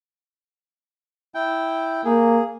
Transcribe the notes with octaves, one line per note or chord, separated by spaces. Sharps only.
E4 G5
A#3 G#4